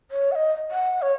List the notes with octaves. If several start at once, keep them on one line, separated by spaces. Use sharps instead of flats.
C#5
F#5
D#5
F#5
C#5